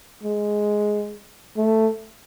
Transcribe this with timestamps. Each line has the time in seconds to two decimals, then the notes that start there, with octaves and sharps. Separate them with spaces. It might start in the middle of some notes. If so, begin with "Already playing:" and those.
0.23 G#3
1.57 A3